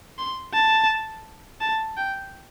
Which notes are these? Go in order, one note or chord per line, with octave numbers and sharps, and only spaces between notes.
C6
A5
A5
G5